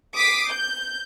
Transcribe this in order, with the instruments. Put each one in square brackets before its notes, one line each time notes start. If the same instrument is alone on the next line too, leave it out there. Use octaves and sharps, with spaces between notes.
[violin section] D6 D#6 B6 C7
G6